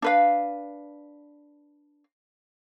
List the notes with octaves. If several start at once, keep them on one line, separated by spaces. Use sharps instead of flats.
D4 B4 F5